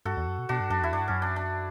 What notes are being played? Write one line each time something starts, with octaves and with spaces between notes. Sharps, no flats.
G2 F#4 A4
E2
F#2
B2
B2 D4 F#4
G2
F#2 D4
E2 E4
F#2 D4
G2
F#2 C#4
D4
D4